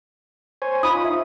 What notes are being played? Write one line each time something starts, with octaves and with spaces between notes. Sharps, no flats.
C5 C#5 G#5
D#4 F4 B5 D#6
E5